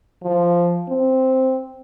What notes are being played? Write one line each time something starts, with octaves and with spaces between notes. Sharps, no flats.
F3
C4